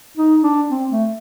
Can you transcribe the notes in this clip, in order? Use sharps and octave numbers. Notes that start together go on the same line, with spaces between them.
D#4
D4
C4
A3